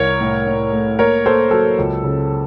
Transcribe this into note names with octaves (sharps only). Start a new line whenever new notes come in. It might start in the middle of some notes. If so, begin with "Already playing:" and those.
Already playing: C2 A#4 C#5
A2
A2
A3
A#3 A#4 C#5
A#3 A4 C5
F#3 A4
C#2
C#3